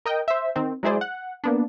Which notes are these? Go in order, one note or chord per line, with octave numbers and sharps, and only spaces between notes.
A#4 D#5 G5
C5 E5
D#3 C4
F#3 G#3 E4 G#4 C5 D5
F#5
A#3 B3 D4